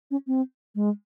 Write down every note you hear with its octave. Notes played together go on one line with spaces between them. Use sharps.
C#4
C4
G#3